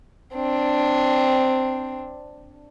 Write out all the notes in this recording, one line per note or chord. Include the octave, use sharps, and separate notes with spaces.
C4 D4